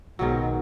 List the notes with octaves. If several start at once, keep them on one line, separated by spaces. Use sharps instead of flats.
B1 G#2 B2 D#3 F#3